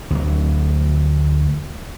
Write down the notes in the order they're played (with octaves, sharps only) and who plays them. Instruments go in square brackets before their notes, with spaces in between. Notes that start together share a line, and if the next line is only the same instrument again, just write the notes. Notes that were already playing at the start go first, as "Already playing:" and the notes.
[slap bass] D2 F#3